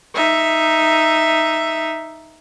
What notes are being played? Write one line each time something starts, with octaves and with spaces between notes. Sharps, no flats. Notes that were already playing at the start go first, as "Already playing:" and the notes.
D#4 E5